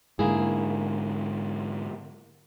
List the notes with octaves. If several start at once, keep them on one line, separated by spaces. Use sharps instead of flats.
G#2 D3 A#3 E4 G#4